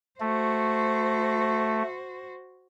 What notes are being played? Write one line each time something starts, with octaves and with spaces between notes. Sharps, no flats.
A3 F#4 C5